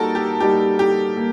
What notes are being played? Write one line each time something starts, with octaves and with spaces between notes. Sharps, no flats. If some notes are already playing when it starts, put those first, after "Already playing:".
Already playing: G3 A#3 D#4 F#4 A4 A#4
G4
G3 A#3 D#4 F#4 G4
G4
G3 A#3